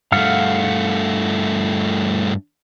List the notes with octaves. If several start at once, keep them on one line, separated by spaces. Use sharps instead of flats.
G2 A3 F5 F#5 F6